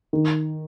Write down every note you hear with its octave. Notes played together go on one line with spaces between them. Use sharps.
D#3